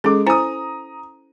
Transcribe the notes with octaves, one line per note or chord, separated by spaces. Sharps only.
G#3 C#4 A4 D6
E4 C5 G#5 A#5 D#6